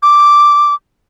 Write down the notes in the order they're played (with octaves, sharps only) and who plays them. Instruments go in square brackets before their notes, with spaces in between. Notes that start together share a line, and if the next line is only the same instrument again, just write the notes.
[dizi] D6